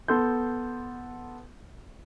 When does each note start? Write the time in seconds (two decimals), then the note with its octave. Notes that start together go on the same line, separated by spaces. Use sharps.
0.08 B3 A4 C6 G6